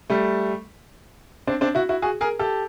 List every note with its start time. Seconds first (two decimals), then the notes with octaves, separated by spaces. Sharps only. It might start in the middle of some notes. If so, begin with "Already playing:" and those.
0.10 G3 A3
1.47 C4 D4
1.61 C4 D4
1.75 E4 F#4
1.89 E4 F#4
2.02 F#4 G#4
2.21 G#4 A#4
2.39 G4 A4